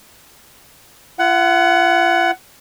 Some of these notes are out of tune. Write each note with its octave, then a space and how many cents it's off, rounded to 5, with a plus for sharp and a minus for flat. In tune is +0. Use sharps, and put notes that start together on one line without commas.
F4 -40 F#5 +10